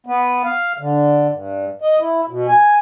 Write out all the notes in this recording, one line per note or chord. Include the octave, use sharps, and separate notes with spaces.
B3
F5
D3
G2
D#5
E4
B2
G#5